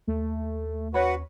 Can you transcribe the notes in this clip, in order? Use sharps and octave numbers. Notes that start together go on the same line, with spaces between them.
D#2 A3
C#4 F#4 B4 C#5 F#5 B5